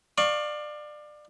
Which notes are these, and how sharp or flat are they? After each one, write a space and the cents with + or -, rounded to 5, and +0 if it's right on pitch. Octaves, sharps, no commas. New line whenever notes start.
D5 +25 F5 +10 C#6 +0